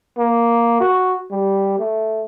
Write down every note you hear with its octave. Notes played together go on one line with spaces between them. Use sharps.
A#3
F#4
G3
A3